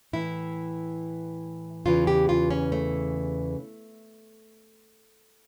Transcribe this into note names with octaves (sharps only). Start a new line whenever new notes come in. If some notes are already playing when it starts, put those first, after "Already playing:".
A2 E3 E4
E2 C#3 E3 F4
G4
F4
C#4
A3